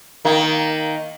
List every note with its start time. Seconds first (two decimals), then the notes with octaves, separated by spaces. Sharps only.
0.25 D#3 A#3